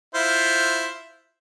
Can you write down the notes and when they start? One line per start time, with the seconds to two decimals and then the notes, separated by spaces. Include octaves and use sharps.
0.15 E4 F4 C5